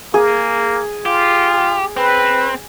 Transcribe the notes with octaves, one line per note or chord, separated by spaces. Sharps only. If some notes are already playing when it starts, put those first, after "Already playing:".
A#3 G#4
F4 G4
C4 B4